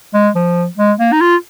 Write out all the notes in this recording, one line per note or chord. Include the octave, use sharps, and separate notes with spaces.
G#3
F3
G#3
A#3
D#4
F4